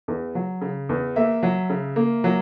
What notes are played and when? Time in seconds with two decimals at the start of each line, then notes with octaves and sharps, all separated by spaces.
0.08 E2
0.35 F#3
0.61 C#3
0.89 E2
1.16 A#3 E5
1.43 F#3
1.70 C#3
1.96 A#3
2.24 F#3